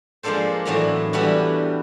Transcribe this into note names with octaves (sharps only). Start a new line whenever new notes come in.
F3 G#3 A#3 D4 A4 C5
A2 E3 F#3 B3 D4 A#5
E3 G3 B3 D4 E4 F#4